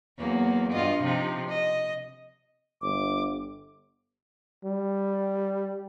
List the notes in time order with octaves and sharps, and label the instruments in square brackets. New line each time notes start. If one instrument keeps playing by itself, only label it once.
[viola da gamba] E2 F#3 A#3
G2 F4 D#5
C3 F3 D#4
D#5
[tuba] G1 [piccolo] D6
[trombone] G3